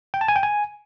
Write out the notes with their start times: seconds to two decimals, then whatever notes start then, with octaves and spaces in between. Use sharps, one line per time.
0.14 G5
0.21 A5
0.28 G#5
0.36 G5
0.43 G#5